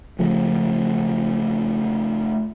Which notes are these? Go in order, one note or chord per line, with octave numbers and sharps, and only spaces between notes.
C#3 F3 A3